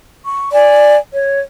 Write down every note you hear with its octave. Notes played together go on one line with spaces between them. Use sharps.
C#6
D5 G#5
C#5